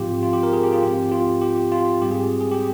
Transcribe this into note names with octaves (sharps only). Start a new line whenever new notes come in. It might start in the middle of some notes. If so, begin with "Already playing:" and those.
Already playing: G#2 F3 C4 F4 G4
F4
G4
A#4
G#4
G4
F4
G#2 F3 C4 G4
F4
G4
F4
G#2 G3 C4 G4
G#4
G#4
G4